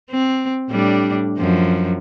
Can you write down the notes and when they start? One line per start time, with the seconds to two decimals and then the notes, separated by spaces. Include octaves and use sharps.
0.10 C4
0.70 A2 G3 D4
1.38 F#2 F3